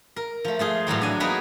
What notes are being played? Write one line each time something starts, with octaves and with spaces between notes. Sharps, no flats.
A#4
F3 A3
A3 F4 G#4
A2 E3 F#3 G3
D4 G#5
A#3 B3 D#4 G#4 A#4 B4